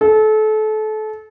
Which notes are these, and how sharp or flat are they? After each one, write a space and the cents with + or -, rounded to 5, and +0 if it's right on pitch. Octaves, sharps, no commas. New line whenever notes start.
A4 -30